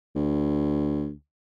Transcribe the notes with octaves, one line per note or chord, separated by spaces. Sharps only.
D2